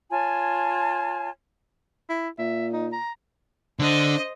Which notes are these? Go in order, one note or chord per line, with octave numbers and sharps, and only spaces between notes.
F4 C#5 G#5 A5
E4
A#2 E5
D#4
A#5
D3 D4 C5 D#5